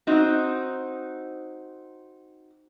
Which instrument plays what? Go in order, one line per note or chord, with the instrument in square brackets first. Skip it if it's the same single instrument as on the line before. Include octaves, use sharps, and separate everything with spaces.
[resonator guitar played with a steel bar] C4 D#4 F#4